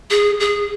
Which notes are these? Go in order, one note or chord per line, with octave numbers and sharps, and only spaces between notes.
G#4
G#4